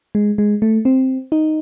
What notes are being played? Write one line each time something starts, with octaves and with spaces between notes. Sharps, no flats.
G#3
G#3
A3
C4
D#4